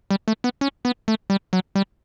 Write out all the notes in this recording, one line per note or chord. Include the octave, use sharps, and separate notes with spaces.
G3
A3
B3
C#4
B3
A3
G3
F#3
G3